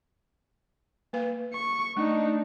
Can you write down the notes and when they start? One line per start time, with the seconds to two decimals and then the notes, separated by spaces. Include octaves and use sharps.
1.13 A#3 B4 F5
1.53 C#6
1.97 A3 D4 D#4